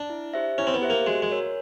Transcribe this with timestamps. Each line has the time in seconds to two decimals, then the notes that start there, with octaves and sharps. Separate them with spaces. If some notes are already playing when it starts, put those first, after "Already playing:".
Already playing: D4
0.10 E4
0.34 G4 C5 E5
0.58 C#4 E4
0.67 C4
0.74 B3
0.82 G4 C5 E5
0.90 A#3
1.07 G#3 F#4
1.22 G#3
1.31 A#4 C#5